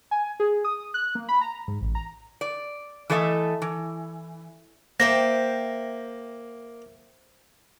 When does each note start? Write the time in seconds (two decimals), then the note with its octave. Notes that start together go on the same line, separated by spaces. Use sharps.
0.11 G#5
0.40 G#4
0.64 D#6
0.94 F#6
1.15 A#3
1.29 B5
1.41 A#5
1.68 G#2
1.81 A1
1.95 A#5
2.41 D5
3.10 E3 A3 A4 D#5 E5
3.62 E3
5.00 A#3 C5 E5 G5 A#6